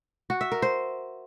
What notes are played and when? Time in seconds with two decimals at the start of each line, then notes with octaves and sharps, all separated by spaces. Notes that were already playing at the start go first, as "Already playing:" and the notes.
0.30 F#4
0.41 E5
0.52 A#4
0.62 C5